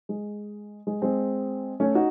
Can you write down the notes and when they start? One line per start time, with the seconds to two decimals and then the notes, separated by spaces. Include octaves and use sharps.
0.09 G#3
0.87 G#3
1.02 G#3 C4
1.80 A3 C#4
1.95 D#4 F#4